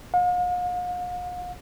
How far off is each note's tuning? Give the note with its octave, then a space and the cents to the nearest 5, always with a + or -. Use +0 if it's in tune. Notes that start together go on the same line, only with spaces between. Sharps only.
F5 +45